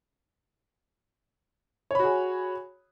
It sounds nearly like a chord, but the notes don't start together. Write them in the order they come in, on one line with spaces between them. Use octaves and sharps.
C#5 B5 F#4 G#4